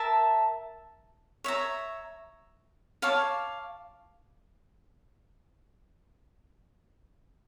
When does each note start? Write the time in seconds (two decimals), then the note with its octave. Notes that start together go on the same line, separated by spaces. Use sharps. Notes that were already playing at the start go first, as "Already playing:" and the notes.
Already playing: A#4 E5 A5
1.44 C#5 E5 A#5
3.02 C#5 F5 A5 D6